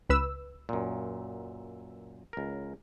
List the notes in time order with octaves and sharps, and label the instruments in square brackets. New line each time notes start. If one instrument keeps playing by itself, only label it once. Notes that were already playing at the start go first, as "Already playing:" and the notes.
[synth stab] C#2 B4 E6
[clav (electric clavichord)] F#2 A#2
C#2 A#4